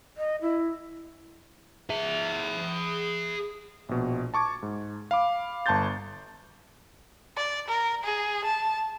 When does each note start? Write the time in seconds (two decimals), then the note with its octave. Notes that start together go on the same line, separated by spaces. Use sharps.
0.17 D#5
0.42 E4
1.90 G#4 E5
3.89 A#1 B2
4.34 A5 C#6 D6 G#6
4.63 G#2
5.11 F5 B5 D6
5.66 G1 A5 A#5 C6 G6 A6
7.37 D5
7.68 A#4
8.04 G#4
8.45 A5